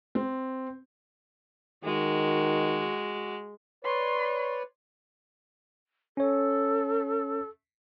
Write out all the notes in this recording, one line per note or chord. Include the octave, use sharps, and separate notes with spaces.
C4
D#3 G#3 F#4
B4 C#5 D5 C6
C#4 A4 C#5